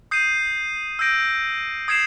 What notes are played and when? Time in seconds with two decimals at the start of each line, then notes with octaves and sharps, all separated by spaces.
0.11 D#6 G6 C7 D#7
0.99 E6 G6 A#6 D7
1.88 D#6 G#6 C7 E7